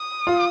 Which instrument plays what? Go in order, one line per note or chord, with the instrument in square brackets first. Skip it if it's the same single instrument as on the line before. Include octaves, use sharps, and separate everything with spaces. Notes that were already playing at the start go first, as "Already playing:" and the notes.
Already playing: [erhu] D#6
[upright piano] F4